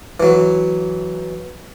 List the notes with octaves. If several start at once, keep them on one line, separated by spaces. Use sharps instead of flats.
E3 F#3